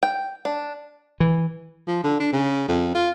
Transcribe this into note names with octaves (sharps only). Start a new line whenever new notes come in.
G5
D4
E3
F3
D3
D4
C#3
F2
F4